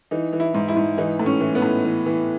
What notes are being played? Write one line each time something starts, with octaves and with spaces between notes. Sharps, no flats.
E3 D#4
E3
E4
G#2
E4
G#2
E3 D#4
A2
C#4
E3
B3
A2
E3
E3